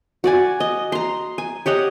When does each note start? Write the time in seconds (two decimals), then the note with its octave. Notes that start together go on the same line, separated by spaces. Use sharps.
0.24 F#4 D5 G#5
0.60 D#5
0.92 A#5 C6
1.38 G#5
1.66 G4 C#5 D#5 F#5